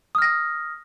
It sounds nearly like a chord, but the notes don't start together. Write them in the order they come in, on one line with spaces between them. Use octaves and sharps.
D#6 F6 A#6